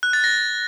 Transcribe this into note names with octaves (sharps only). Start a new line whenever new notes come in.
F#6
A6
A#6